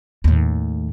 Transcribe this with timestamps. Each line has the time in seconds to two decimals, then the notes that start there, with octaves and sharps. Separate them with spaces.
0.24 D#2 A2